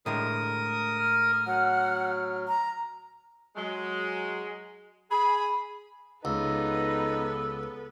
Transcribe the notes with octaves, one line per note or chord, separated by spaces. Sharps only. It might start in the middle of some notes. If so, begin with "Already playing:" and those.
A2 D3 G#3 A#4 D#6
F6
F#3 F#5
A#5
F#3 G#3
G#4 B5
C#2 B3 D#4 A4 B4 E6